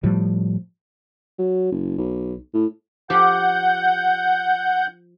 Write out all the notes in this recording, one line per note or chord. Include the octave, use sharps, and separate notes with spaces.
A2 F3 G3
F#3
F#1
B1
A2
F3 G4 F#5 G6